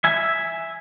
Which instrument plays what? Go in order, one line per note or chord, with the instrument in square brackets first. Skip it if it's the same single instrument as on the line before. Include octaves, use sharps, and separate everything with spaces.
[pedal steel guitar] E5 G#5